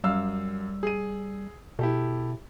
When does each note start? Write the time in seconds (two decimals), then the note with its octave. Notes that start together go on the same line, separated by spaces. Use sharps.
0.04 F#2 G3 F5 E6
0.83 G#4 D#7
1.79 B2 E4 G4 A4